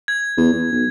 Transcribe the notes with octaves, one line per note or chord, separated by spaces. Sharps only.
G#6
E2
E2
B1